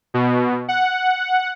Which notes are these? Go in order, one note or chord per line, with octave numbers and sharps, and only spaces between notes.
B2
F#5